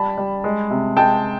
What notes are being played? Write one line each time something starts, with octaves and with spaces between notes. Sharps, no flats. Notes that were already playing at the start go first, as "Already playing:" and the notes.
Already playing: G3 A5 B5
G3
G#3
C3
G#3 G5 A5